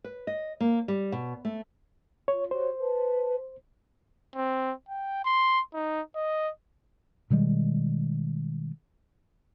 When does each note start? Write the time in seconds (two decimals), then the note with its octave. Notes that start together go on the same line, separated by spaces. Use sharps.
0.04 B4
0.27 D#5
0.60 A#3
0.88 G3
1.12 B2
1.45 A3
2.28 F4 C#5
2.51 F#4 G4 C5 C#5
2.79 B4 A5
4.35 C4
4.89 G5
5.25 C6
5.74 D#4
6.15 D#5
7.30 B2 D#3 G3 G#3